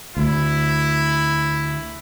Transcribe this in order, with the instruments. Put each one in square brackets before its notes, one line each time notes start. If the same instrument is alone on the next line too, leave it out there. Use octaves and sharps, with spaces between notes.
[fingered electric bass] D2 [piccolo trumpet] E4